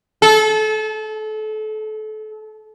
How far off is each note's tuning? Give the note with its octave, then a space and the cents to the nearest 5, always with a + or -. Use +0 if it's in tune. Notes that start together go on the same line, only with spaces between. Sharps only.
A4 -30